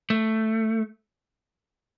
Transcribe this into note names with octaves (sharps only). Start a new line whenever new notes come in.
A3